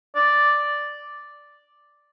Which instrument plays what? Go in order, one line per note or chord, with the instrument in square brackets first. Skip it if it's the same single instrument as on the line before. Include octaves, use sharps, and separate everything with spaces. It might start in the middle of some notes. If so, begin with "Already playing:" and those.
[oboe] D5